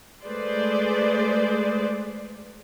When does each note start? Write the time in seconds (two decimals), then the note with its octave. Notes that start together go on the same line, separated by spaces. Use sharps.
0.24 G#3 A3 G#4 B4 C5 D5